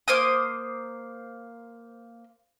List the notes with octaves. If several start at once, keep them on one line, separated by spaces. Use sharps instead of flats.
A#3 C5 D6 D#6